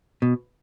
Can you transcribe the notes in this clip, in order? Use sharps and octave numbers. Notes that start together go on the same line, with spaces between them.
B2